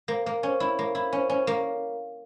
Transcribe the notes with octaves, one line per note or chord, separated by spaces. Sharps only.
A#3
A#3
C#4
E4
A#3
E4
C#4
C#4
A#3